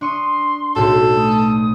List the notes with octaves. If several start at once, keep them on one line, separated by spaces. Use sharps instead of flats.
D4 C6 C#6 D#6
B1 A2 F#4 A4
A3 D#6